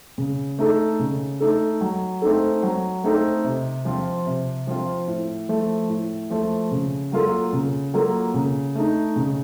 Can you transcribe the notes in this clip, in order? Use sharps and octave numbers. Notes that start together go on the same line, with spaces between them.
C#3
A3 D#4 A4
C#3
A3 D#4 A4
F#3
A3 C4 D#4 A4
F#3
A3 C4 D#4 A4
C3
F3 C4 F4
C3
F3 C4 F4
A2
F3 A3
A2
F3 A3
C#3
F#3 A#3 F4 A4
C#3
F#3 A#3 F4 A4
C#3
A3 D#4
C#3